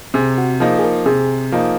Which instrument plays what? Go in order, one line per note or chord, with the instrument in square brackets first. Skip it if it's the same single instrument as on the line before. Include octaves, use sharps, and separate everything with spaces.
[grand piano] C3 [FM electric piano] G#4
[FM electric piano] F#4
[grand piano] F3 A#3 D#4 [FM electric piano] G#4
[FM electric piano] G#4
A#4
[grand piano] C3 [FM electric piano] G#4
[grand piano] F3 A#3 D#4